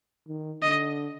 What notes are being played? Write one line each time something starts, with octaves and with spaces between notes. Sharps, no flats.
D#3
D3 D#5